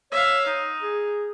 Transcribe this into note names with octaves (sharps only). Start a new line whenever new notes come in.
C#5 E5 F5
D#4
G#4